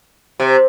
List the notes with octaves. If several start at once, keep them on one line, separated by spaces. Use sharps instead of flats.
C3